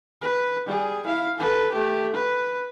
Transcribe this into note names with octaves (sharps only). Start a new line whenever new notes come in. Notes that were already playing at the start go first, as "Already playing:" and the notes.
B4
G3 G#4
E4 F5
A4 B4
A3 G4
B4